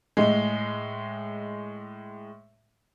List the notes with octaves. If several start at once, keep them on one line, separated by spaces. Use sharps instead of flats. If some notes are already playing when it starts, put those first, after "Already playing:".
A2 G#3